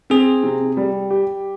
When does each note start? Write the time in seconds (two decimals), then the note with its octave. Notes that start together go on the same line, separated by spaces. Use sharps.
0.10 C4 G#4
0.43 C3
0.77 G3
1.11 G4